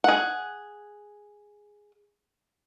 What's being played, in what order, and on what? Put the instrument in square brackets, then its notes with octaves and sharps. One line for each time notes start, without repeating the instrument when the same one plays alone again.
[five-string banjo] G#4 F#5